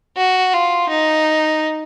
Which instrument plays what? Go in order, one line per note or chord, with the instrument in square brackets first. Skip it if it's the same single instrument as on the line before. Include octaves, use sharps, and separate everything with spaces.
[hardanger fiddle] F#4
F4
D#4